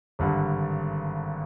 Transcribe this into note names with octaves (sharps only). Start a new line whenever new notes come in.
G#1 G2 D3